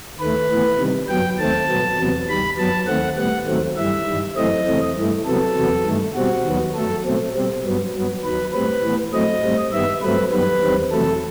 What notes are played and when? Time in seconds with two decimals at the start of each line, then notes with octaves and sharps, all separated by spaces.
0.20 D#2 D#3 A3 B4
0.50 A2 E3 B3
0.79 C3 D#3 G3
1.08 F#2 F#3 B3 G5
1.39 D#2 D#3 A3 C4 A5
1.68 B2 F#3 B3
1.98 E2 C3 F#3 B3
2.28 D#2 D#3 G3 B5
2.58 F#2 F#3 B3 A5
2.87 D#2 D#3 A3 C4 F#5
3.17 A2 G3 B3 F#5
3.47 D#2 D#3 F#3 A3 C4
3.76 G2 E3 G3 E5
4.07 G2 D#3 G3
4.36 F#2 E3 A3 C4 D#5
4.67 E2 C3 E3 A3 C4
4.97 G2 E3 A3
5.26 C3 F#3 B3 A4
5.56 E2 C3 F#3 B3
5.86 G2 D#3 A3
6.15 B2 G3 C4 F#4
6.44 D#2 D#3 F#3 B3
6.75 F#2 F#3 A3 A4
7.04 B2 F#3 A3 C4
7.34 B2 G3 C4
7.65 G2 F#3 B3
7.94 G2 F#3 B3
8.24 D#2 D#3 F#3 B4
8.53 A2 G3 C4 B4
8.84 A2 E3 B3
9.13 A2 F#3 A3 C4 D#5
9.43 A2 G3 C4
9.72 G2 D#3 G3 B3 E5
10.02 G2 F#3 A3 C4 B4
10.32 F#2 D#3 G3 B3 B4
10.62 E2 D#3 G3 C4
10.92 E2 C3 F#3 A3 A4